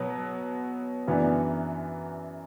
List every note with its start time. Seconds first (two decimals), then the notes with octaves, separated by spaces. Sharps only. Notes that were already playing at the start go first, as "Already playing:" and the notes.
Already playing: B2 F#3 B3
1.07 F#2 E3 B3 D4